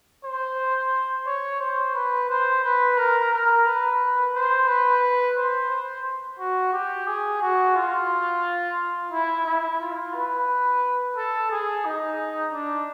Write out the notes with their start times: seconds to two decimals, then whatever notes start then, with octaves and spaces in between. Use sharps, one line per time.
0.24 C5
1.26 C#5
1.60 C5
1.95 B4
2.29 C5
2.64 B4
2.97 A#4
3.32 A#4
3.66 B4
4.34 C5
4.67 B4
5.37 C5
5.70 C5
6.39 F#4
6.73 G4
7.07 G#4
7.42 F#4
7.76 F4
9.11 E4
9.46 E4
9.80 F4
10.14 B4
11.16 A4
11.51 G#4
11.85 D#4
12.53 D4